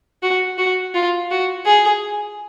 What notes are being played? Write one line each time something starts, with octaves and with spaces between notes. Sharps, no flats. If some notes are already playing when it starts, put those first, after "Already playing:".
F#4
F#4
F4
F#4
G#4